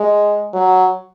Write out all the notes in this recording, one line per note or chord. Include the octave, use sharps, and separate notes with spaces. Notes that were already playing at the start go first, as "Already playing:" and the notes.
Already playing: G#3
F#3